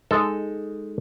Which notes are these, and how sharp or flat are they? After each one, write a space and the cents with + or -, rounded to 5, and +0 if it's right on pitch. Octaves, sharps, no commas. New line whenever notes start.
G#3 +0 D#4 +0 A4 +0